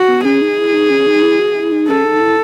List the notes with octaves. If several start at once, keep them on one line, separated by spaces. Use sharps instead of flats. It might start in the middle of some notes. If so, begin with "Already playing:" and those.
Already playing: F#4
B3
C#4 G#4
D#4
E4
D#4
C#4
D#4
E4
F#4
E4
D#4
C#4 A4
D#4
E4